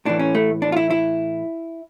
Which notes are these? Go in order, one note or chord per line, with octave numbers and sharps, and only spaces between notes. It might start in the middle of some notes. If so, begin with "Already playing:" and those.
A2 E3 D4
C#4
A3
D4
F4
E4
E4